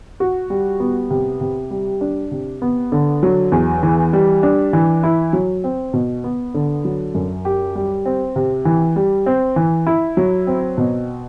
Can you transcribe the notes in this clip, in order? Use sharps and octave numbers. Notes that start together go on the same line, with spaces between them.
F#4
G3
B3
C3
C3
G3
D4
C3
B3
D3
F#3
E2
E3
G3
D4
E3
E4
F#3
C4
B2
B3
D3
F#3
F#2
G4
G3
C4
C3
E3
G3
C4
E3
E4
F#3
C4
B2